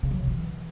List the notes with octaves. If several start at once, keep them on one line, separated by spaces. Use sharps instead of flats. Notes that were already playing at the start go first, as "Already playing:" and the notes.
C#3
F#3
B2
E3